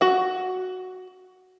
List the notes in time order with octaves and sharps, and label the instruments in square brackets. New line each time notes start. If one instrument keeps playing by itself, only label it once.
[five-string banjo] F#4 F#5